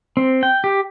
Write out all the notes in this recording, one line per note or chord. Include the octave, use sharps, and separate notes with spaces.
C4
G5
G4